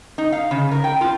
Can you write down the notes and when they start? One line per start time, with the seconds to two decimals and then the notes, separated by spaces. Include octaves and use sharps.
0.18 D#4
0.32 F5
0.51 C#3
0.71 A#4
0.84 G5
1.01 F4